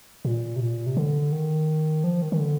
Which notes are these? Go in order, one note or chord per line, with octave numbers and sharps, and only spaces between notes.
A#2
C3
A#2
C3
D3
D#3
F3
D#3
D#3
D3